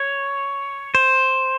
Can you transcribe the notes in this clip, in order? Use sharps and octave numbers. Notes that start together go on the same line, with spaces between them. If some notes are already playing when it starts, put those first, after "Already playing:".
Already playing: C#5
C5